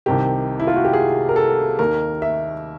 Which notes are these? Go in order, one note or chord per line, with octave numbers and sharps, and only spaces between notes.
C2 C3 D#3 G4
E4
F4
F#4
G4
G#4
A#4
A4
D#2 D#3 A#4
E5